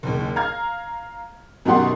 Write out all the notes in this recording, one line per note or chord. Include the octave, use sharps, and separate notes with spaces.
F#1 D#2
F5 A#5 F6 G#6
F#2 B2 D#3 G4 F#5 C6